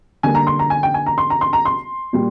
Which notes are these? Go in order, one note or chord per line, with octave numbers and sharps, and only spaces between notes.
D3 G3 A#3 G#5
A#5
C6
A#5
G#5
G5
G#5
A#5
C6
A#5
C6
A#5
C6
A#2 G3